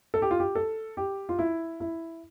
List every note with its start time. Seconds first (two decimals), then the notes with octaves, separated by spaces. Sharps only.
0.14 A4
0.22 G4
0.31 F4
0.40 G4
0.55 A4
0.97 G4
1.29 F4
1.39 E4
1.80 E4